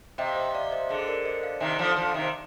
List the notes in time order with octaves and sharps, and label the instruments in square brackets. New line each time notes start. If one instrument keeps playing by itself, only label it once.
[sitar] C3 [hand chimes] D#5 G5
[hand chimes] F5
C5 D#5
D5 F5
C5 D#5
[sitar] D3 [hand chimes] G#4 C5
[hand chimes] A#4 D5
C5 D#5
D5 F5
[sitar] C3 D#3
D3 F3
D3 F3
C3 D#3